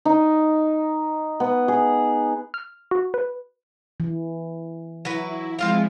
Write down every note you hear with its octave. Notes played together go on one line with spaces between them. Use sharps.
D#4
B3
G#4
F6
F#4
B4
E3
F#3 E4 B4
F3 G#3 C4 E4 F4 F5